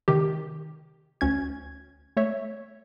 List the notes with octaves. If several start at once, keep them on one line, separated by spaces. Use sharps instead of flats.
C3 D#3 G4
D2 C#4 G#6
A3 C#5 E5